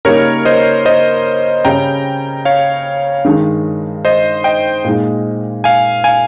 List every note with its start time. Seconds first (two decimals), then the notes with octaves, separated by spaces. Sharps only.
0.05 C#3 G3 A#3 D#4 A#4 C#5
0.45 C5 D#5
0.85 C5 D#5
1.65 C#3 G3 C#4 G5 A#5
2.45 C#5 F5
3.25 G2 D#3 G#3 D#4
4.05 C5 D#5
4.44 D#5 G5
4.84 A#2 G#3 D#4
5.64 F5 G#5
6.04 F5 G#5